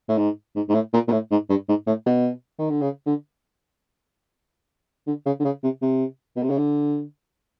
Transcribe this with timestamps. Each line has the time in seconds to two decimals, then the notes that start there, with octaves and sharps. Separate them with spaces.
0.09 A2
0.17 G#2
0.55 G#2
0.69 G#2
0.74 A2
0.93 A#2
1.08 A#2
1.12 A2
1.31 G#2
1.50 G2
1.69 G#2
1.87 A2
2.06 B2
2.59 D#3
2.70 D3
2.81 C#3
3.06 D3
5.07 D3
5.26 C#3
5.39 D3
5.45 C#3
5.63 C3
5.82 C3
6.36 B2
6.43 C3
6.50 C#3
6.57 D3